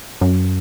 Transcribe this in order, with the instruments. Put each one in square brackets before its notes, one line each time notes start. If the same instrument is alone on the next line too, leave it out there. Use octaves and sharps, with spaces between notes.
[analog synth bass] F#2